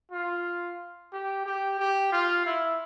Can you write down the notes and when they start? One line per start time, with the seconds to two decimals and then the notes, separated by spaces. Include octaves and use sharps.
0.12 F4
1.13 G4
1.46 G4
1.79 G4
2.12 F4
2.46 E4